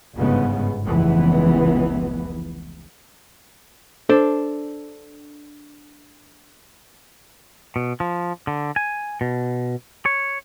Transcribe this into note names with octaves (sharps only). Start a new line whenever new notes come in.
G1 G#2 C#3 B3
F1 C#2 E3 B3
D4 A4 C5 D5
B2
F3
D3
G#5
B2
C#5